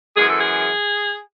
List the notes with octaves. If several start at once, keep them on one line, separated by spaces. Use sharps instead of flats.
F#2 E3 G#3 G#4
A4
G#4